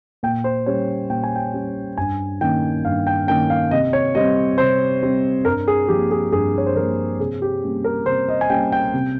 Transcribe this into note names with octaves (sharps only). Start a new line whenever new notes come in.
A#2 G5
C5
G3 C#4 C#5
A#2 G5
G#5
G5
G3 C#4
G2 G#5
D#3 A#3 C#4 G5
G2 F5
G5
D#3 A#3 C#4 G5
F5
C3 D#5
C#5
G3 C4 D#5
C3 C5
G3 C4
G2 A#4
G#4
F3 A#3 G4
G#4
G2 G#4
C#5
C5
F3 A#3 A#4
C3 G#4
G4
G3 A#3 C#4
A#4
C3 C5
D#5
G#5
G3 A#3 C#4 G5
G5
C3